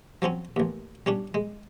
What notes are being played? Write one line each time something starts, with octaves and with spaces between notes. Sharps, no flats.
F3 F#3 C4 C#4
A1 D#2
G3 C#4 D4
G#3